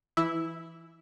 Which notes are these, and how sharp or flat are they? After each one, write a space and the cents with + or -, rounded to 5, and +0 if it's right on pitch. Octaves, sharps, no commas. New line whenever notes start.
E3 +15 E4 -5 E6 +0